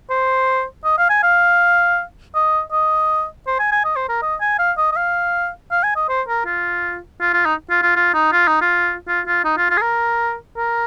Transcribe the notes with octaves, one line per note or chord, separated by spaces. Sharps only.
C5
D#5
F5
G#5
F5
D#5
D#5
C5
G#5
G#5
D#5
C5
A#4
D#5
G#5
F5
D#5
D#5
F5
F5
G#5
D#5
C5
A#4
F4
F4
F4
D#4
F4
F4
F4
D#4
F4
D#4
F4
F4
F4
D#4
F4
F4
G#4
A#4
A#4